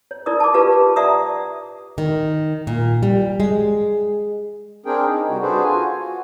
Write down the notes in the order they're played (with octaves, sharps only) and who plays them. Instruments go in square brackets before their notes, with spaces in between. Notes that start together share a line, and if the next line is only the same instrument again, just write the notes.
[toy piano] C#5
D#4 E4 A#4 D5 D#6
A5 D6
F4 G4 B4 F5 A5
D5 E5 F#5 A5 A#5 D#6
[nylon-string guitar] D#3
A#2
G3
G#3
[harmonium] C4 D4 G#4 A#4 G5
D#4
C3 G3 F#4
D4 F#4 G#4 A4 B4 C5
F4 F#4 G#5
F#4